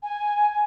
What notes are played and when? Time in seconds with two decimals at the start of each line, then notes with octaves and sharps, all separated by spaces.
0.03 G#5